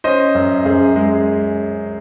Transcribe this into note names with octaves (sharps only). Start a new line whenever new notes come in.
C#4 C5 D#5
F#2
F#2 G#4 C5
G#3